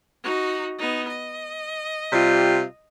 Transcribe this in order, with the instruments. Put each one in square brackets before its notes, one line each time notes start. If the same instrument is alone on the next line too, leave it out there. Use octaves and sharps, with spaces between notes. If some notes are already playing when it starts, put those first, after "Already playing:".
[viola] D#4 F#4
B3 D#4
D#5
[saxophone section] C3 G3 F4